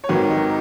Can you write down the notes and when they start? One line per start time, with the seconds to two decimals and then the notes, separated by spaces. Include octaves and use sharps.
0.04 C#5
0.09 G#1 G#2 D#3 F#3 B4
0.30 D#5